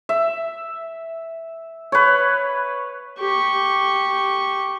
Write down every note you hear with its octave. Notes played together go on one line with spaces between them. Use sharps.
E5
B4 C#5
G4 C#6